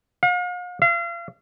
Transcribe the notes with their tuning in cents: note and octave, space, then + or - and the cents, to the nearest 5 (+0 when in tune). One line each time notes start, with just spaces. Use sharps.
F5 +45
F5 -35